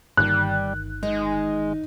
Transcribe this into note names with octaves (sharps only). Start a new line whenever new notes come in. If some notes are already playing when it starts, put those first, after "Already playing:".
G1 D#3 G3 F#6
G#3 D#4